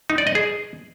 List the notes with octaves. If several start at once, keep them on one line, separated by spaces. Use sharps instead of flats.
D#4
D5
D#5
G#4